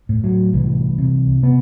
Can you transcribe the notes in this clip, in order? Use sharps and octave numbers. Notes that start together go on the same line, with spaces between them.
A2
F#3
C2 E3
C3
C3 B3